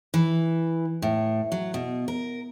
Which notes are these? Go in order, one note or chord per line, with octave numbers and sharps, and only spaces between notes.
E3
A2
F#3
B2
A#4